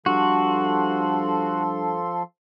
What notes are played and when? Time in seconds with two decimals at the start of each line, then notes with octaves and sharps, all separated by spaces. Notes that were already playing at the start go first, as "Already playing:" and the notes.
0.06 G2 F3 F#4 A4 C6